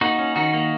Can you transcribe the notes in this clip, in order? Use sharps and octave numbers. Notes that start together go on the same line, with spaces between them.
A#3 D#4 F#4
C#4
D#3 D#4 F#4
A#3